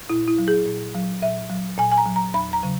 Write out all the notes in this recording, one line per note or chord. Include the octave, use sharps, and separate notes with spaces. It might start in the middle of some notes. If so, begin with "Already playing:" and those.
A#2 E4
E4
F#3
G#4
A#2
F#3
A#2 E5
F#3
A#2 G#5
G#5
A#5
F#3
A#5
E2 B5
A#5
C#3 F#3